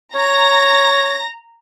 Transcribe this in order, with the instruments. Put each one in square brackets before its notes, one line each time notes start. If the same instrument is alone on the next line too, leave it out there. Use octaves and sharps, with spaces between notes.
[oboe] C#5 [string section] A#5 A#6